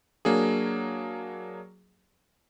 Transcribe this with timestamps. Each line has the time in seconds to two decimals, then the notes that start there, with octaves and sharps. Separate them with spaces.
0.25 F#3 A#3 D4 G#4